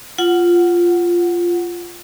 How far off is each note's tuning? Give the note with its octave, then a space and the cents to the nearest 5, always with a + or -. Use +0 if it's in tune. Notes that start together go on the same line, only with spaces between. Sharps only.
F4 -5 F#5 +5